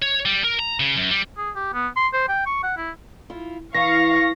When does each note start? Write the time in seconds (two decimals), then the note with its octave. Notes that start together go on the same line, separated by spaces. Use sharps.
0.02 C#5
0.25 G3
0.44 A#4
0.59 A#5
0.80 C#3
0.97 F#2
1.11 G3
1.37 G#4
1.55 G4
1.74 B3
1.96 C6
2.13 C5
2.29 G5
2.46 C#6
2.63 F#5
2.77 E4
3.30 E4 F4
3.74 E3 F5 C#6 A#6